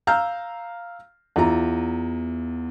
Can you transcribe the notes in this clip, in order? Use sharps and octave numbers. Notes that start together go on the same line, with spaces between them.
F5 A#5 E6 F6 G6
E2 E4 F4 A#5